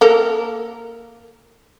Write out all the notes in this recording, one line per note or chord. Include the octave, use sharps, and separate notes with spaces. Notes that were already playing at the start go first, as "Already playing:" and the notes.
A#3 A4 A#4